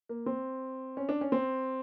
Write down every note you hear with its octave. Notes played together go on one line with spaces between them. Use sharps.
A#3
C4
C#4
D4
C#4
C4